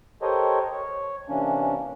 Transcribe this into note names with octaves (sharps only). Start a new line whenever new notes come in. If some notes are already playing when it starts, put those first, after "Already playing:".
G4 A4 A#4 C5 C#5 D#5
C#5
C3 E3 A#3 C#4 D4